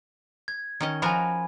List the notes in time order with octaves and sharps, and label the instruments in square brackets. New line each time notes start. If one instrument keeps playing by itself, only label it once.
[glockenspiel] G#6
[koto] D#3 C#4 D#5
[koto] F3 F#4 A#4 [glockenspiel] G#5 B5